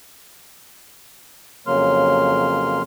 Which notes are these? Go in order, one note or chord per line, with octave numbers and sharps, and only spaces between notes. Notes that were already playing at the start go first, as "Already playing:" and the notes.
F2 C#3 F#3 A#3 C6 F6